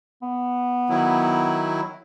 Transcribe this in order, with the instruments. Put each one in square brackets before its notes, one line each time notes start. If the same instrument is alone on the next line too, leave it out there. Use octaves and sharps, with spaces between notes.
[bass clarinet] B3
[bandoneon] D#3 F#3 E4